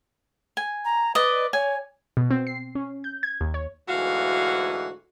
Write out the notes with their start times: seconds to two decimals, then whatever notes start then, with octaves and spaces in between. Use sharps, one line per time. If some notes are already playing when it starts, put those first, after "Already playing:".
0.57 G#5
0.85 A#5
1.15 B4 D5 D#5
1.53 C#5 G#5
2.17 B2
2.31 C4
2.47 C7
2.75 C#4
3.04 G6
3.23 G#6
3.41 D#2
3.54 C#5
3.88 D2 G#2 E3 F#4 F5